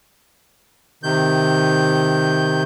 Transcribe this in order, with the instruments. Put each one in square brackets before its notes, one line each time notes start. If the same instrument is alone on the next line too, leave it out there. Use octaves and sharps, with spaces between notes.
[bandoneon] C3 D#3 G6